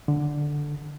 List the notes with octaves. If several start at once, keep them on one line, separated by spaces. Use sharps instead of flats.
D3